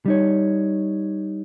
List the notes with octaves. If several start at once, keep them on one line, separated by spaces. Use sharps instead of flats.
G3 D#4 C#5